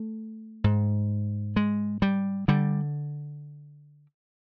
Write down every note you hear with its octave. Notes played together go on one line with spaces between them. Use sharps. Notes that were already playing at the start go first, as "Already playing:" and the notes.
Already playing: A3
G#2
G#3
G3
D3 G3